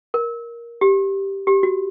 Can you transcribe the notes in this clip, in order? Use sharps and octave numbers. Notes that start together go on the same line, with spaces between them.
A#4
G4
G4
F#4